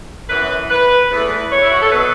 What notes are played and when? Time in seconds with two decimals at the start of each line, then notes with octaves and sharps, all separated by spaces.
0.29 F#2 E3 B3 B4
0.70 B4
1.11 E2 E3 A3 B4
1.52 C#5
1.62 E4
1.72 F#4
1.82 A4
1.92 B2 F#3 B3 B4